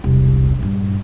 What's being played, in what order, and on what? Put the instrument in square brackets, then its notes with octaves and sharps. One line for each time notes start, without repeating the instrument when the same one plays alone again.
[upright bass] E1 C2
A#1 G2